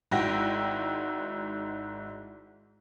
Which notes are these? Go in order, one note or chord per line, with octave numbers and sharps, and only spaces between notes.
G#1 G#2 E4 F#4 G5 A#6